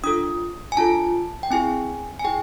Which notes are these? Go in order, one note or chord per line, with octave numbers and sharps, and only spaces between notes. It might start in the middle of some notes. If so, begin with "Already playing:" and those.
D4 F4 A4 D#6
G#5
D4 F4 A4 A5
G5
C4 E4 G#4 G#5
G#5
E4 G#4 G5